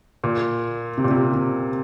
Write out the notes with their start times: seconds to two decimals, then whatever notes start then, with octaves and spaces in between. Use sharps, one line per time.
0.24 A#2
0.97 C3
1.04 A#2
1.10 C3
1.34 C3